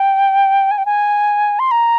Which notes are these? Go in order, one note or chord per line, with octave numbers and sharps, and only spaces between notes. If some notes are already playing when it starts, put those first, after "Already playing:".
Already playing: G5
G#5
G5
G#5
C6
A#5